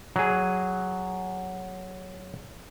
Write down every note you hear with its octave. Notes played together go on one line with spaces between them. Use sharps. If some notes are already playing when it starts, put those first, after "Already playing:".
F#3 G#4